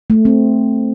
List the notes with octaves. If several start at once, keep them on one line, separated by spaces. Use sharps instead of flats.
A3
C4